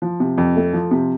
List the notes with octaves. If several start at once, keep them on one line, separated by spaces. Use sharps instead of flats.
F3
C3
F2
A3
F3
C3